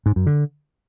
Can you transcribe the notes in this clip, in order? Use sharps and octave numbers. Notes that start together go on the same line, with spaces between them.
G#2
F#2
D3